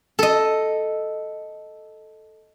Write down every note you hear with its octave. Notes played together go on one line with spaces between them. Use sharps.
A4 D#5